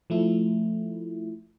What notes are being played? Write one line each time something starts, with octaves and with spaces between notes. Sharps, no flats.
F3 A3 E4